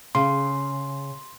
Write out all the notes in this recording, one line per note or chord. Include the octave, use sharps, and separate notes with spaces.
C#3 C6